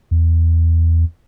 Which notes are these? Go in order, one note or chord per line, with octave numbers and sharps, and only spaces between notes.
E2